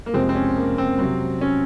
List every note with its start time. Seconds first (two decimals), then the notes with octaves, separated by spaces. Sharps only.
0.06 A#3
0.14 F2 C3 F3 G#3 C4
0.29 C4
0.35 C#4
0.57 A#3
0.78 C4
0.99 C3 F#3 C4
1.41 C#4